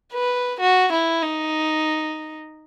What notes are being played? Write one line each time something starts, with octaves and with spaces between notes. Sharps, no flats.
B4
F#4
E4
D#4